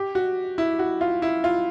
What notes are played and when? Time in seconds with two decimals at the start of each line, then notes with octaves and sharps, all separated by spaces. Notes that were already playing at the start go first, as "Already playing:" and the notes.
Already playing: G4
0.15 F#4
0.58 E4
0.79 F#4
1.01 F4
1.22 E4
1.44 F4